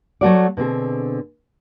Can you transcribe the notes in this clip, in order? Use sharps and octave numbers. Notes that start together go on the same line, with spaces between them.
F#3 A3 F#4 D5
B2 D3 C4 G#4